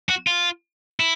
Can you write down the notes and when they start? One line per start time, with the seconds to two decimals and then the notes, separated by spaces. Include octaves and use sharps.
0.09 F#4
0.27 F4
1.00 E4